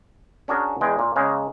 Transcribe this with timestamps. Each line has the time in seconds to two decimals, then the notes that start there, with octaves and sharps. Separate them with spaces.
0.48 C#4 D4 F#4 G#4 A#4
0.81 E2 G#3 G5
0.99 A#2
1.16 C#3 G#3 A#3